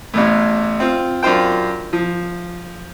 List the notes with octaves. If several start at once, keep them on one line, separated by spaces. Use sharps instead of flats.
A1 E2 A2
C4 F4
F#2 D4 F4 C5 G5
F3